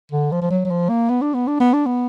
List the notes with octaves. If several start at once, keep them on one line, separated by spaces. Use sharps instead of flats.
D3
F3
F3
F#3
F#3
F3
A#3
B3
D4
B3
D4
B3
D4
B3